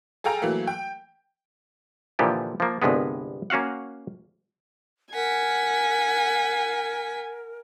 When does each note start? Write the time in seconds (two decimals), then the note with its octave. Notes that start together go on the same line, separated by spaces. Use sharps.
0.24 G#4 A4 F5 G5 A#5
0.42 E3 F#3 A3 A#3
0.67 G5
2.19 A#2 D3 E3 F3 G4
2.60 F3 A#3
2.82 G1 C2 G2 G#3 B3
3.50 A#3 C#4 F#4 F5 F#5
5.14 A#4 F#5 G#5 B6